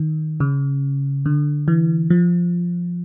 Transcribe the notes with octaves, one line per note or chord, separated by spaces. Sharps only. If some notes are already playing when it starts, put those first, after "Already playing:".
Already playing: D#3
C#3
D3
E3
F3